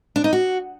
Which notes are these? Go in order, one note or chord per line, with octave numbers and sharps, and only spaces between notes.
D4
D#4
F#4